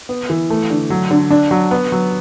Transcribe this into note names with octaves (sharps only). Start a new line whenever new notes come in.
B3
E3
A3
D3
F#3
D3
D4
F#3
B3
F#3